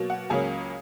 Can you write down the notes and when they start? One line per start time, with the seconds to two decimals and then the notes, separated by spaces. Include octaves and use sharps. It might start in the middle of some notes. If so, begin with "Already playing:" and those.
Already playing: B2 F#3 A#3
0.10 F#5
0.30 C#2 C#3 F#3 A#3 C#4 G#4